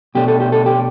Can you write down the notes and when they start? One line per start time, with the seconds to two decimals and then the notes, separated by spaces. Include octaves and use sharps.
0.15 B2 A3 D4 G4
0.28 A4
0.40 G4
0.52 A4
0.66 G4